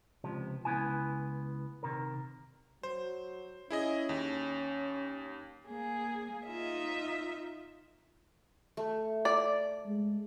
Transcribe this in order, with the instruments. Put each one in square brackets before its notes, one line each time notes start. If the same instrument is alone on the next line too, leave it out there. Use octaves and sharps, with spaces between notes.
[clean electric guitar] C#2 C3 F3
C#2 E3 B3 E4 G#5
C3 D#3 A#4
[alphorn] F#3 [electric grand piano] C5
[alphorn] C#4 [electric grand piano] E4 G#4 D#5
[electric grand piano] D#2
[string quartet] A#3 G#4
D#4 F4 D#5 E5
[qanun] A3
[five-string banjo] D5
[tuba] G#3